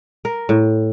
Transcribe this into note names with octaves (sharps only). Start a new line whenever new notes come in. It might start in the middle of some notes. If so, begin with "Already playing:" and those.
A#4
A2